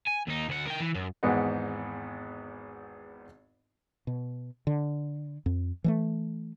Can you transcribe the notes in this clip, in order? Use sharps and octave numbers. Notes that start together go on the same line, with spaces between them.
G#5
D#2 D#4
D2 F#5
A#4 G5
E3
F#2
G#1 E2 G#2 B3 D#5 F#5
B2
D3
F2
E3 G3 A3